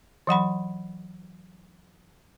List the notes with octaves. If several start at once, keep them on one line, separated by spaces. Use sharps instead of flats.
E3 F#3 F#5 B5